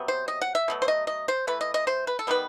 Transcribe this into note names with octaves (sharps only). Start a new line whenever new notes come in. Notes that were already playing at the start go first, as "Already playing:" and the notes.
Already playing: C3 F#3 B3
C5
D#5
F#5
E5
B2 F#3 A3
C5
D#5
D#5
C5
E3 A3 B4
D#5
D#5
C5
B4
A4
D#3 G3 B3 B4